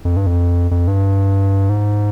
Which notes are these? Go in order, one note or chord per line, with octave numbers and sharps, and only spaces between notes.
F2
G2
F2
F2
G2
G#2